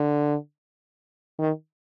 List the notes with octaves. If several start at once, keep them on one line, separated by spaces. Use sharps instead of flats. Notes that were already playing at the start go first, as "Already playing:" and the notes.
Already playing: D3
D#3